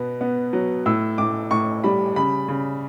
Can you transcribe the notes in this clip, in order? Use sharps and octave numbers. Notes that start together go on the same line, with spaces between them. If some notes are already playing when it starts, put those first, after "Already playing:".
Already playing: B2 B3
B3
F#3
A2 E6
A2 D6
A2 C#6
G3 B5
C#3 B5
C#3